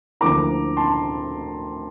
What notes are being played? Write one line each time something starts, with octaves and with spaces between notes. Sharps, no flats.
D2 D3 F3 A#3 E4 A#5 D6
A5 C6